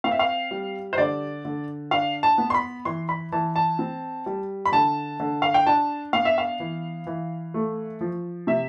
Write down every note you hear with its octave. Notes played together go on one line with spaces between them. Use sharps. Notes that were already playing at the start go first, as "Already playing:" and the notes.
C4 F5
E5
F5
G3
C5
D3 D5
D3
D4 F5
A5
B3
C6
B5
E3 C6
B5
E3 A5
A5
C4
G3
B5
D3 A5
D3
F5
G5
D4 A5
B3 F5
E5
F5
E3
E3
A3
F3
C3 E5